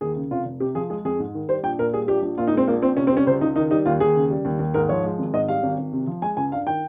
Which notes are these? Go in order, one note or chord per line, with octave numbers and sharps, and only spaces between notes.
D#2 G#4
C#3
F1 F4
F1
C3 G4
F3 G#4
G#3 G#4
F2 G#4
G#2
D#3
G3 C5
A#1 G5
A#2 A#4
G3 G#4
A#1 G4
A#1
A#2 F4
D#4
G#3 C4
A#1 A#3
A#1 C4
C3 C#4
C4
G3
C#4
C#2 C5
C#2 D#4
D#3 D#4
G3 D#4
D#2 F4
D#2 G#4
C#3
G3
D#2
D#2
G#2 A#4
F3 C#5
G#3
G#1
G#2 D#5
G3 F5
G#1
G#1
C3
F3
G#3 G#5
C#2 G#5
G2 F5
D#3 G5